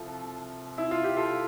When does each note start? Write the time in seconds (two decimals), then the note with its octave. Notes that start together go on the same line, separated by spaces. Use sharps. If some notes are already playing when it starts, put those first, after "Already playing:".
Already playing: C2 F3 F4 A4
0.78 E4
0.91 F4
1.04 G4
1.17 F4 A4